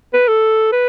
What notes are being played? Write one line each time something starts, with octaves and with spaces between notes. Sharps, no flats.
B4
A4
B4